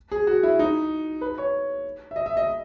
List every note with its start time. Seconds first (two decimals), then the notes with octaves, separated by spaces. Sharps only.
0.12 G#4
0.27 F#4
0.43 E4
0.59 D#4
1.21 B4
1.38 C#5
2.11 E5
2.16 D#5
2.26 E5
2.37 D#5